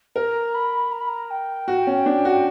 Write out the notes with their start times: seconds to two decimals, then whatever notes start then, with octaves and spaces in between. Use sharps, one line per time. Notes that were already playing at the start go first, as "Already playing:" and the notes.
0.15 A#4 A#5
0.54 B5
0.91 A#5
1.00 B5
1.08 A#5
1.30 G5
1.68 F#4
1.87 C#4
2.06 D4
2.25 F#4